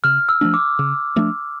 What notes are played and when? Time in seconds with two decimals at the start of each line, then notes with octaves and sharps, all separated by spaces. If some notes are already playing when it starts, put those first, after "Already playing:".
0.04 C#3 F6
0.29 E6
0.41 F3 A3 D4
0.54 D6
0.79 C#3
1.16 F3 A3 D4